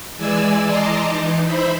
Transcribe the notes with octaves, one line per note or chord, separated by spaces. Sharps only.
E3 G#3 D5 G#5 E6
D#5 A5 A#5 C6 D6
E3 D#4
C5 E5 B5